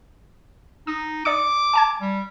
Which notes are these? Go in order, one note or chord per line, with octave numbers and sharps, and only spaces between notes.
D#4 D#6
D5 D6 D#6 C#7
G#5 A5 G#6
G3